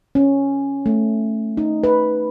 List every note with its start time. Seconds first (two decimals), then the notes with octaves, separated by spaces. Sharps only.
0.15 C#4
0.86 A3
1.57 D#4
1.84 B4